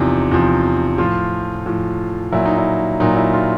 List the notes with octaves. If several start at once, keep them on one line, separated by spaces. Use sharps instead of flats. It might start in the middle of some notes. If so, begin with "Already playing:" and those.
Already playing: E2 C3 F3 D#4
E2 C3 F3
A2 F3 F4
A2 F3
A#2 F#3 E4
D#4
E4
A#2 F#3 D#4
E4
F4